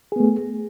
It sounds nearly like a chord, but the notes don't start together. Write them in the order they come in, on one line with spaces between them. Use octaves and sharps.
G#4 B3 A3